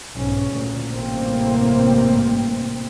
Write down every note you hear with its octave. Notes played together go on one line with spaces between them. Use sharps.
B1 G#2 C#4
D2 A#2
A1 G2 C3 A#3 C4